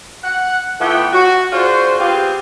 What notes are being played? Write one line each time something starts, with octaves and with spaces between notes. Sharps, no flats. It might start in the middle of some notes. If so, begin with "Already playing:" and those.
F#5
E3 A3 B3 F4 F#5 G5
F#4
D4 F4 F#4 G#4 C5
B3 C4 F4 G4 G#4 F5